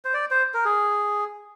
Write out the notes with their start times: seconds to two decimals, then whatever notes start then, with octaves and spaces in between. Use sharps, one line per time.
0.05 C5
0.14 D5
0.30 C5
0.54 A#4
0.65 G#4